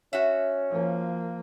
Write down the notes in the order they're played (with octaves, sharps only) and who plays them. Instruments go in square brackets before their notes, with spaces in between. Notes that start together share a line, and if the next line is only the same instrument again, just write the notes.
[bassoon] C#4 [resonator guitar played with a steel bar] F#4 E5
[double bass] F3 A#3